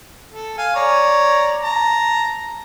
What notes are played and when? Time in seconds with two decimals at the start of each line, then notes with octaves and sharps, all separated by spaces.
0.32 A4
0.58 F5 G#5
0.75 C#5 D5 A#5
1.64 A5 A#5